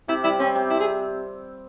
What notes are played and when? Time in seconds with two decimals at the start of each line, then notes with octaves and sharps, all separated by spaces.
0.08 C3 E4
0.24 G3 E4
0.39 C4 C#4
0.55 C3
0.70 C3 E4
0.80 G#4